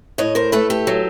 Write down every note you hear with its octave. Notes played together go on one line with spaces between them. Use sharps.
A2 C#5 D#5
A#4 C5
A3 A4 B4
G4 A4
F#3